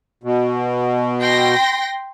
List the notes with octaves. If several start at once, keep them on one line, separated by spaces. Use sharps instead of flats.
B2
G5 C6 A#6